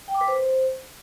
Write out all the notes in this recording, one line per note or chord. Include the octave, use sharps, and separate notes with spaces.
G5
D6
B4
C5